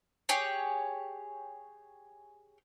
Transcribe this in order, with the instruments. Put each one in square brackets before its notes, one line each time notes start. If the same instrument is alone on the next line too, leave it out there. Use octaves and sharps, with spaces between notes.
[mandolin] G4 G#4 C#5